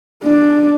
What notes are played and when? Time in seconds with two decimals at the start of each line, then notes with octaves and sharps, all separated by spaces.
0.24 D4